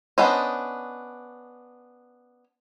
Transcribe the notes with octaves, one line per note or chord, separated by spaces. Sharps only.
B3 C#4 D4 C5 D#5